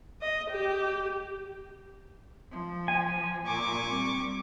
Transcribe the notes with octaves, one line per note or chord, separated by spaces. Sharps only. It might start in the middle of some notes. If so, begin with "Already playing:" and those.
D#5
G4
F3
G#5
A#2 C#6 D6
G3 C4